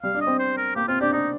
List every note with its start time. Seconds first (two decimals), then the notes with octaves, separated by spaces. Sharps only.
0.03 G3 F5
0.14 D4
0.21 D#5
0.27 C4
0.39 C5
0.57 A#4
0.76 A#3 G4
0.88 C4 F4
1.01 D4 G4
1.12 D4 D#4